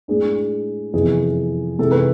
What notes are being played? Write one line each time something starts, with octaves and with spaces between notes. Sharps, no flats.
A2 G#3 D4 G#4
F2 C3 E3 B3 G#4
C3 E3 G#3 A4
B4